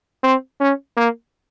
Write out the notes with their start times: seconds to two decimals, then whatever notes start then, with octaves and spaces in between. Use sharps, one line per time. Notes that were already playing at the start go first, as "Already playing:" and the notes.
0.23 C4
0.60 C#4
0.97 A#3